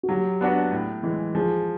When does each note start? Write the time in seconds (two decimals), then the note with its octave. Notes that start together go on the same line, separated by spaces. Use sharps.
0.03 F#4
0.09 F#3 G4
0.41 B3 D4 F#4 B4
0.72 A2
1.03 E3 G#3
1.34 F3 G#4